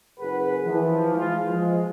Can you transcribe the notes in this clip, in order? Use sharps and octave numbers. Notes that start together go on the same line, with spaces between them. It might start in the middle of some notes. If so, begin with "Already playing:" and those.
F#1 G#4 A#4 B4 F#5
E3 F3
G#3 F4
F3 G#3